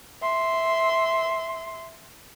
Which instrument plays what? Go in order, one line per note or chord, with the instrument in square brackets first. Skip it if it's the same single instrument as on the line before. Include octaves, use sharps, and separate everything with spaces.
[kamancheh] E5 C6